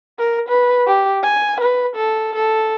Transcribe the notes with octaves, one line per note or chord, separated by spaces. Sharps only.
A#4
B4
G4
G#5
B4
A4
A4